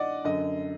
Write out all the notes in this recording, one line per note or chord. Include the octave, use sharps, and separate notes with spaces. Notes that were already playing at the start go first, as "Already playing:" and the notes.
Already playing: G2 D#3 D5 D#5 F#5
F#2 D3 D#5